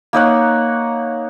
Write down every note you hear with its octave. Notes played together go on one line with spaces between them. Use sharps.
A#3 D#4 C#5 F#5